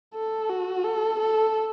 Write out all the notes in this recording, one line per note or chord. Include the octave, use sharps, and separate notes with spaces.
A4
F#4
A4
A4